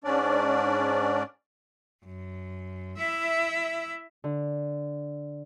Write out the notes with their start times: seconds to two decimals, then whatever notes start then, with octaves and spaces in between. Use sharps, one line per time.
0.04 G#2 C#4 D4 D5
2.04 F#2
2.98 E4 E5
4.24 D3